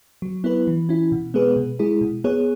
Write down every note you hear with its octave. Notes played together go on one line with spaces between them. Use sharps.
F#3
B3 E4 B4
E3
C#4 E4
B2
G#3 B3 G#4 B4
B2
G#3 E4 G#4
B2
B3 G#4 C#5